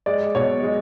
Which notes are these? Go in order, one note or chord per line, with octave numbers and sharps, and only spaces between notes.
G#3 D5
B2 C#5
G#3